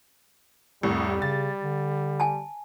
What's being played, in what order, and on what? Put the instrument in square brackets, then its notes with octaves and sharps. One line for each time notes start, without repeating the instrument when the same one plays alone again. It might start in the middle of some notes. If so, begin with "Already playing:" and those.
[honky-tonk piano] C2 A2 [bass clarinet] F2 [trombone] G3
[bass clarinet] C#3 [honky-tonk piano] A6
[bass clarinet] D3
[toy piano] G#5 A5